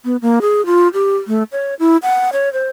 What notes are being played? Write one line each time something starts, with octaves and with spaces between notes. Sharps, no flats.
B3
A#3
G#4
F4
G4
A3
C#5
E4
F#5
C#5
C5